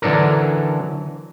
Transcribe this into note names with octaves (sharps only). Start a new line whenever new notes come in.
D3 E3 F#3 D4 A4 A#4